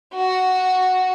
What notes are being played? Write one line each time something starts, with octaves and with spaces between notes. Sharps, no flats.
F#4